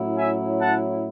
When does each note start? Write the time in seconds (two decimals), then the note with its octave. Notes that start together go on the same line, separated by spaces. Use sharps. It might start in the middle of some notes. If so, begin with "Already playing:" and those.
Already playing: A2 F#3 C#4 E4
0.16 E5 G#5
0.60 F#5 A5